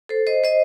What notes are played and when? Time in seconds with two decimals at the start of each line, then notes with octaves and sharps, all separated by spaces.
0.09 A4 C5
0.27 C5 D#5
0.44 C5 D#5